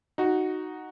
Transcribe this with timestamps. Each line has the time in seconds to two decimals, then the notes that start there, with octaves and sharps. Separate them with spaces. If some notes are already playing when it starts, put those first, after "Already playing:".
0.18 D#4 F#4